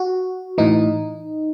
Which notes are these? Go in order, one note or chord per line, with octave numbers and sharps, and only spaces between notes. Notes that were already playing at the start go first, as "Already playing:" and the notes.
Already playing: F#4
A2 E3 D#4